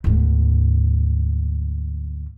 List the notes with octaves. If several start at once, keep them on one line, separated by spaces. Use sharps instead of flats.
D2 G#2